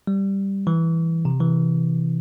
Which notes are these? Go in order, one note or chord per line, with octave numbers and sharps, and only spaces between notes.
G3
E3
C3
E3